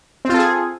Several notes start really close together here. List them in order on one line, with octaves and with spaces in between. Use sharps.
C4 F4 A4 G#4